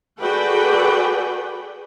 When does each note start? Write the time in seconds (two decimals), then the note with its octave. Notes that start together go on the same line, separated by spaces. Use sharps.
0.22 F#4 G#4 A4 B4 D5 G5